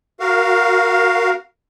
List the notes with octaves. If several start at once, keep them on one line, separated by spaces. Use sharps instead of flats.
F#4 A#4 F5